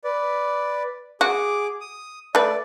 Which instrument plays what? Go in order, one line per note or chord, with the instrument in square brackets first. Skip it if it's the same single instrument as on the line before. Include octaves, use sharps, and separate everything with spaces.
[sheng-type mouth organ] B4 D5
[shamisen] F#4 [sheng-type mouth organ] G#4 D6
[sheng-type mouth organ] D#6
[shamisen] A3 B4 [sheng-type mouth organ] D5